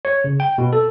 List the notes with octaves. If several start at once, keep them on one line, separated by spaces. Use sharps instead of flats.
C#5
C#3
G5
B2
A4